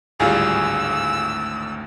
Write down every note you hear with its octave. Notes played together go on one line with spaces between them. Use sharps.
G#1 D2 A2 G3 F4 G#4 E6